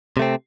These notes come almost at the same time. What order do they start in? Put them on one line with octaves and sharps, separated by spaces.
C3 A3 C4